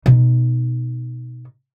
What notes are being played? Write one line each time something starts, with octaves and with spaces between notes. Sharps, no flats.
B2 D#4